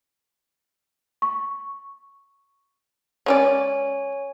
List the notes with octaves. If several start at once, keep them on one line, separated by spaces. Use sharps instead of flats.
C#6
G#3 C#4 C#5 D5 G#5